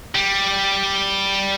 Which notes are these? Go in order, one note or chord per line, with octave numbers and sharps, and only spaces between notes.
G3